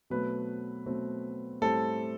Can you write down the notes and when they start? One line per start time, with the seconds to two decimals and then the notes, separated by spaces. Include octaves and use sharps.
0.10 B2 F#3 A3 C4 B4
0.86 B2 F#3 A3 C4
1.61 A2 G3 C4 A4